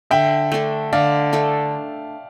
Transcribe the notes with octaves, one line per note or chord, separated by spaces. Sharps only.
D3 E5 G5
A3 D4 A4
D3 D5 F5
A3 D4 A4